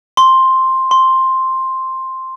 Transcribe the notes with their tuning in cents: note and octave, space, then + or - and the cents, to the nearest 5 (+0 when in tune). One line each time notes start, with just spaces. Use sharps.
C6 +5
C6 +5